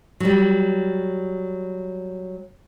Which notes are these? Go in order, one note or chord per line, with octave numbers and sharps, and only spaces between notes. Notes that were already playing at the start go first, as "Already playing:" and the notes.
F#3 G3